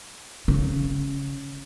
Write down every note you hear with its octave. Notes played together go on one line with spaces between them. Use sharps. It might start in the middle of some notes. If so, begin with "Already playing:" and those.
C#3